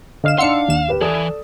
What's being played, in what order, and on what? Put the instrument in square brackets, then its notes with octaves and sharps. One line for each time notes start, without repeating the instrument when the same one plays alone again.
[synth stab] D3 F5 E7 [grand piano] D#5 F6
[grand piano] D4 D#4 F#5 [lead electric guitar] F5 [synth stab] C6 E6 C#7
[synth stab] D#2 E7
[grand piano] G4 B4
[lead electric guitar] E3 [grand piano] A4 D5 D#6